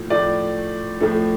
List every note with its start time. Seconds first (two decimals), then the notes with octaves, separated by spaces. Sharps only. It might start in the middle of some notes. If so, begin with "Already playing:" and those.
Already playing: A2 F3
0.10 A2 F3 A3 D5
1.00 A2 F3 A3